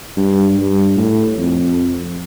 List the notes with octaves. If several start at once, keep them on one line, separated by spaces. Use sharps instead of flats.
G2
G2
A2
F2